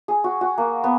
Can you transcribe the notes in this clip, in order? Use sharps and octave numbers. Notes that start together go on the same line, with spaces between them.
G#4
F#4
F#4
A#3
B3